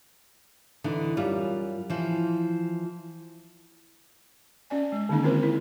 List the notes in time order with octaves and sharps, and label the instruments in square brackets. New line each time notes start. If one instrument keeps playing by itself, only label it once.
[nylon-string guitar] D3 E3 D#4
F#2 G3 F4
E3 F3
[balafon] C#4 D5 G#5
G#3
D3 D#3 A#3 C#4 D#4
C4 F4 A#4 C5
E4